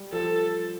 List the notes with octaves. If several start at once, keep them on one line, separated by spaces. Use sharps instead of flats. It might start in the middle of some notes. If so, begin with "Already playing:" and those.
Already playing: G3
F3 A4